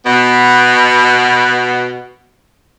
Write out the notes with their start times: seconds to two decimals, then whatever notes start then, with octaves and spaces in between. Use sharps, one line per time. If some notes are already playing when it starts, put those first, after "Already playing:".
0.06 B2 B3